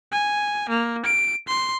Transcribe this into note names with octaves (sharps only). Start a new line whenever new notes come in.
G#5
A#3
D7
C6